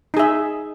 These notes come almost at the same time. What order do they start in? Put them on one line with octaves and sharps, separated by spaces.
D#4 G#4 E5